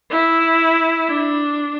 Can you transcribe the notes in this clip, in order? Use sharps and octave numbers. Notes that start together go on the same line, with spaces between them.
E4
D4